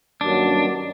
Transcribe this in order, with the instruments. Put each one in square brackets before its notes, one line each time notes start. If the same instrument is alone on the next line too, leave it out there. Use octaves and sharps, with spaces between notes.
[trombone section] G2 D#3 F#3 A#3 C#4 [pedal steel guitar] D4